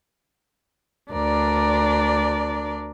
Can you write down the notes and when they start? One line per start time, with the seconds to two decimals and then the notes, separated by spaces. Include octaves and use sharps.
1.13 D2 D4 A#4 D5